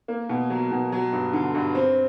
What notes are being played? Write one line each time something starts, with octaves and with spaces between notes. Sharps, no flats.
A#3
B2
F#3
B2
F#3
G2
D3
G2
C4